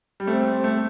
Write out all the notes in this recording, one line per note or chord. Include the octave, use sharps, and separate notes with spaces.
G3
A3 C4
A3